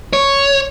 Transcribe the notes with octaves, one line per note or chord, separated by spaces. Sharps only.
C#5